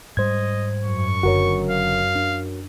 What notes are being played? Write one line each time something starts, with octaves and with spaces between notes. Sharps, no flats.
G#2 G3 C5 D#5 G#6
F#2 C#6
F#1 D3 F#4 A#4 C#5
F5
D4